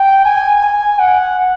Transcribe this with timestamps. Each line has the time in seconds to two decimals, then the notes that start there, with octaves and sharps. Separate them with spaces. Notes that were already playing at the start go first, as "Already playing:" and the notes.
Already playing: G5
0.25 G#5
0.63 G#5
0.99 F#5